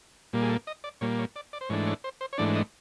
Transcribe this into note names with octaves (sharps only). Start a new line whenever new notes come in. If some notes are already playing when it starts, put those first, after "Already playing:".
A#2 G3 A#3
G#4
A4
D#5
D5
A#2 G3 A#3 C#5
C#5
D5
D5
C5
G#2 E3 A3 D4 C#5
C#5
C5
C5
C#5
G#2 E3 A3 D4 D5
D#5